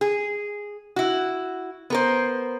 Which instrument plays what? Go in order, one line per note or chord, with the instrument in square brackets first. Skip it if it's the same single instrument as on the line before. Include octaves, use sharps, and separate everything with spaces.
[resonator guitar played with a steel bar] G#4
E4 F#4
B3 A#4 C5